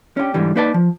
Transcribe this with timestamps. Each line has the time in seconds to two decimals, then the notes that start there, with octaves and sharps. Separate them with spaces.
0.17 C#4 D4 E4 G4
0.34 G#2 D3 E3 G3
0.56 A#3 D#4 B4 D5 D#5 A5
0.74 F3